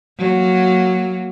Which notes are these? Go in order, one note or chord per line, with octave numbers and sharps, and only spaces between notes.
F#3 A#3